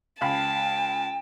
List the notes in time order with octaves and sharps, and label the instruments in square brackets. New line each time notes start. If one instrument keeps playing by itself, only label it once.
[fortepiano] C#2 F5 B5 [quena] G5 [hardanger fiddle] A5